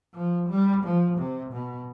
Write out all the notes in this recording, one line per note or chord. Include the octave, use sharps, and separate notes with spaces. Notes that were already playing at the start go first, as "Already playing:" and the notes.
F3
G3
F3
C3
B2